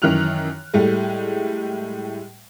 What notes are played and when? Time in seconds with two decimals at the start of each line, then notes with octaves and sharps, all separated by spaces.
0.02 F#2 D#3 E3 F6 F#6 F7
0.74 A2 G3 G#3